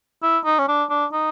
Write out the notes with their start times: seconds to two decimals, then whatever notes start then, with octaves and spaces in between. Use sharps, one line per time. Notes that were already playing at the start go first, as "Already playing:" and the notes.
0.23 E4
0.45 D#4
0.59 C#4
0.69 D4
0.90 D4
1.13 D#4